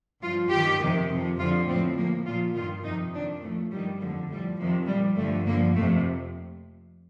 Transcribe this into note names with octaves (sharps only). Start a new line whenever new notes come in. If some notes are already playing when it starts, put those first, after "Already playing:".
G2 F3 F4
G2 D#3 G4
F2 C3 D#3
F2 C3 F3
F2 D3 F3 F4
A2 F3 C4
A2 F3 A#3
A#2 F3 F4
G2 D#3 F4
F2 C3 F3 D#4
F2 D#3 D4
A2 F3 A3
G2 D#3 G3
F2 D3 F3 G3
A2 F3 G3
F2 C3 D#3 F3
A#2 F3 G3
G2 D3 F3 A3
G2 D3 F3 A#3
F2 C3 F3 A3